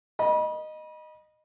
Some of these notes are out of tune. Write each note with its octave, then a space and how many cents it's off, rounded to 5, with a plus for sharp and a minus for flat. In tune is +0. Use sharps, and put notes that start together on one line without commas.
D#5 -10 B5 -35